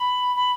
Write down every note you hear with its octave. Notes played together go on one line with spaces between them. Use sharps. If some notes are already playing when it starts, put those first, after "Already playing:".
Already playing: B5
B5